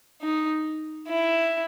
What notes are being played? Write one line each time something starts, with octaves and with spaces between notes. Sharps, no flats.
D#4
E4